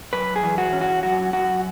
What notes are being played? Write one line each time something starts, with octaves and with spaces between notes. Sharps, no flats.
F#2 B4
G#4
E3
F#4
C#4
F#4
F#2 F#4
F#2 F#4